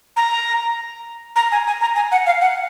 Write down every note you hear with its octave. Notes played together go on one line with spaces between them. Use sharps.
A#5
A#5
G#5
G#5
A#5
G#5
F#5
F5
F#5